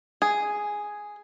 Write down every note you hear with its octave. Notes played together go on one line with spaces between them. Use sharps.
G#4